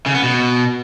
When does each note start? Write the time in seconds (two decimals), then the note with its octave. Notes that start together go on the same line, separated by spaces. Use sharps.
0.06 C#3
0.15 B3
0.23 B2